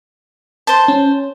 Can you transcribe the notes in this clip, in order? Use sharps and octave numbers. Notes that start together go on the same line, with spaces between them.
C5 A5
C#4